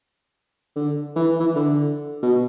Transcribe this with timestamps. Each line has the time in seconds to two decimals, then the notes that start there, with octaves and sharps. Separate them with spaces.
0.76 D3
1.16 E3
1.40 E3
1.56 D3
2.23 B2